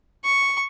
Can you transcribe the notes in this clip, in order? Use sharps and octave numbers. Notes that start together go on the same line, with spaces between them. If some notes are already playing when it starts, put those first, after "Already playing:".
C#6